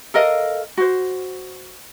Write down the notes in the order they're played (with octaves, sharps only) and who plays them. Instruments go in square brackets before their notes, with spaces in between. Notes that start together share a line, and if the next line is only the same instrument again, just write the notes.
[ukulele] A4 A#4 D#5 F5
F#4 C5